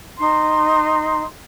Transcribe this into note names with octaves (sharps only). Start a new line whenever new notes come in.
D#4 C6